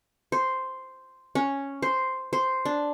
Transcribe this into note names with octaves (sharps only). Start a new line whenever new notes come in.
C5
C#4
C5
C5
D4